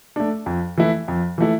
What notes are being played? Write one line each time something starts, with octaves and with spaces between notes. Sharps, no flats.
A3 D4
F2
E3 A3 E4
F2
E3 A3 E4